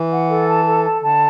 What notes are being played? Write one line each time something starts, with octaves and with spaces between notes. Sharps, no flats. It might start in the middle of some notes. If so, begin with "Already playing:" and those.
Already playing: E3
F#5
A4
A5
A4
A5
D3 A5